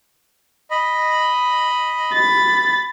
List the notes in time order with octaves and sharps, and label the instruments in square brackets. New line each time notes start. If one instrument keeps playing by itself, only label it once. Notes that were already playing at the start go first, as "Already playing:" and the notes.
[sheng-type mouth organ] D#5 B5
[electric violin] B5 A6